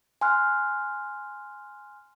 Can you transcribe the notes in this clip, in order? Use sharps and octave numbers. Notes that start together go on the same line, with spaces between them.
G#5 C6 F6 F#6